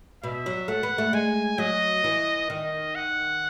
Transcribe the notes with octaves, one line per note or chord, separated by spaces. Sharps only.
B2 E5
F#3
A3 F#5
B3
A3
G#3 G#5
F#3 D#5
E3
D#3 D#5
F#5